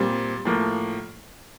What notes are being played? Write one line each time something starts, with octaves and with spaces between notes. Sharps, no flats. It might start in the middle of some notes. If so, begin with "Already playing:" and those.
Already playing: A#2 G3 C4
A2 F3 A#3